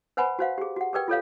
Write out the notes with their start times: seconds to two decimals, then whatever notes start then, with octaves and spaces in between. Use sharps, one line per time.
0.17 B4 C5 F#5 G#5 B5
0.39 F#4 C5 F5 F#5
0.58 G4 G#4
0.76 F#4 F#5
0.93 G4 G#4 A#4 B4 D5 G5
1.08 F4 A4 C#5 F5